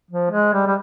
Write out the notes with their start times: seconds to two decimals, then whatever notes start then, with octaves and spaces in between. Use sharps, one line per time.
0.10 F3
0.31 G#3
0.53 G3
0.67 G3